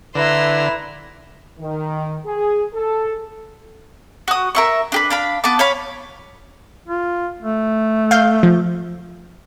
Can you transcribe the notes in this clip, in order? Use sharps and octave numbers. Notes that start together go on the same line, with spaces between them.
D3 E4 B4 A#5 C6 E6
D#3
G#4
A4
F#4 D#6
A#4 E5 C#6
D4 G4 B4
D4 F5 B5
B3 A5 D6
C#5 F5 B5
F4
A3
F5 G6
F3